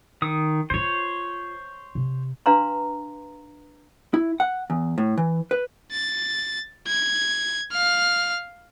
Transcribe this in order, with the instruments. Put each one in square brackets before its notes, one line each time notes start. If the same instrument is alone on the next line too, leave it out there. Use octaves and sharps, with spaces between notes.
[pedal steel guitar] D#3 D#6
[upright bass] D#4 F4 [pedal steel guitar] C5 C#5
[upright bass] C3
[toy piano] D4 B4 F5 A#5 C6
[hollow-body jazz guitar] E4
F#5
E2
A2
E3
B4
[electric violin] A6
G#6
F5 F6